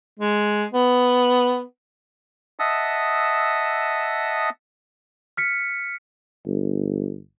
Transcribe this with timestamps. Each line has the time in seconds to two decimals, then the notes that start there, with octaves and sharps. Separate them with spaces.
0.20 G#3
0.73 B3
2.59 D#5 E5 F#5 A5 D#6 E6
5.37 F6 B6 C#7
6.46 G1